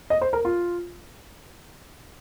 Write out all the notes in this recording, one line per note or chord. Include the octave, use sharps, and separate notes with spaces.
D#5
C5
A#4
F4